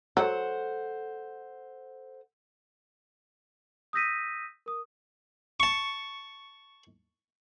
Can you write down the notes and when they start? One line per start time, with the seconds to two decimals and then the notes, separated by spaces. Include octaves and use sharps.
0.17 F#3 A4 C5 F#5
3.93 D#6 E6 G6 A#6 B6 D#7
4.66 A#4 D#6
5.60 A5 C#6